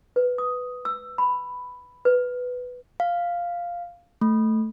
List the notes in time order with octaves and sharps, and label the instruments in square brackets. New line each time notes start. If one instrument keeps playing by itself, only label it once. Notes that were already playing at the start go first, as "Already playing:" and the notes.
[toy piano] B4
D#6
E6
B5
B4
[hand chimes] F5
A3